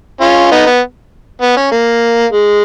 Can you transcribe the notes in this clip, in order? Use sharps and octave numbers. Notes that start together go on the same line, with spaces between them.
C#4 F4
B3 D#4
B3
B3
C#4
A#3
G#3